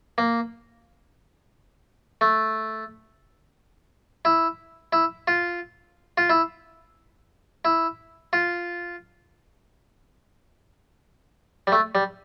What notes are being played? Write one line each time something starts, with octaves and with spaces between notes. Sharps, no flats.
A#3
A3
E4
E4
F4
F4
E4
E4
F4
G3
A3
G3